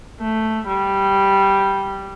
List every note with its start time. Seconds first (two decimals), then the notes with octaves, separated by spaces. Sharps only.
0.20 A3
0.67 G3